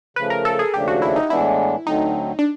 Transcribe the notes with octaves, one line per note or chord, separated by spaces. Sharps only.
C#3 F3 A3 B4
A#4
A4
G#4
D#2 C#3 F3 A3 D4 G4
F#4
E4
D#4
A2 E3 G#3 B3 D4 E4
D2 D3 F#3 A3 C4 D#4
D4